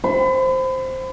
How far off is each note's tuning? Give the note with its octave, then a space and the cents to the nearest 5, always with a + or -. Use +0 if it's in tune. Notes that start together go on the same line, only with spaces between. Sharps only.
C5 +0 B5 +35